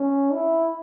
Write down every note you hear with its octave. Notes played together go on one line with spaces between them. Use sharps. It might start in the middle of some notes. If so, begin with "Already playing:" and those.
Already playing: C#4
E4